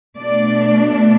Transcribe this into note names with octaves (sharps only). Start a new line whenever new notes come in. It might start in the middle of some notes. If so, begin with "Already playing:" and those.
B2 A3 D4 D5